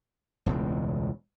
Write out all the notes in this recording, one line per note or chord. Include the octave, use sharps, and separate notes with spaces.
E1 C#2 A2 G#3